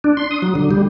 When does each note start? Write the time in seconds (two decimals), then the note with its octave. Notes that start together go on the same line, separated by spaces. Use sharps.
0.04 D4
0.17 C6
0.31 D#6
0.42 F#3
0.55 D3
0.71 G3